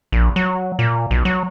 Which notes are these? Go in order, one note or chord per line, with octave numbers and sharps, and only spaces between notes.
A#1
F#3
A#2
B1
F#3